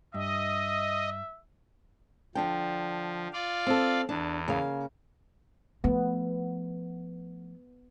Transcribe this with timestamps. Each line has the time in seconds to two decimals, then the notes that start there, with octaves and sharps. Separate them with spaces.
0.14 G2 D#5 E5
2.35 D3 F3 D4 G5
3.33 F4 D5 F5
3.67 C4 A4
4.09 E2 D4
4.48 C#3 A#3 F5
5.84 F3 A3 B3